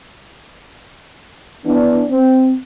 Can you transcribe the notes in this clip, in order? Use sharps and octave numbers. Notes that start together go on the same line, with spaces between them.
E3 B3 D4
C4